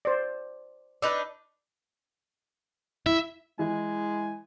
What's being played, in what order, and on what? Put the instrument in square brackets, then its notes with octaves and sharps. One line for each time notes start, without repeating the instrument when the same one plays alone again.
[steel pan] C5 D5
[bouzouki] D4 D#4 B4 [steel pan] E6
[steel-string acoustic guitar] E4 [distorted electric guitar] E5
[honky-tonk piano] E3 [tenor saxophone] G#3 [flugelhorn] G#5